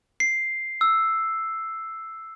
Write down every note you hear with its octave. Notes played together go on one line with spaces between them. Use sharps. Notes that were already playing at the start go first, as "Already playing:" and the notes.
C7
E6